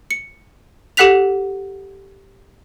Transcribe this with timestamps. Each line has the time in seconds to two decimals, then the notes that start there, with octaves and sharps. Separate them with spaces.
0.11 C#7
0.97 G4 A4 F#5 F#6 B6 F7